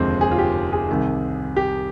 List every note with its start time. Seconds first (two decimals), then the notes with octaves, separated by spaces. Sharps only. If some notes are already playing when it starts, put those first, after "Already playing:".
Already playing: F1 D#2 D3 F3 G#3 C4
0.21 G#4
0.31 F4
0.39 G4
0.72 G#4
0.89 C2 C3 D#3
1.56 G4